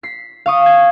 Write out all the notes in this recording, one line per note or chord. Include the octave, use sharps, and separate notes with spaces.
B6 C7
F5 C#6 D#6
G#6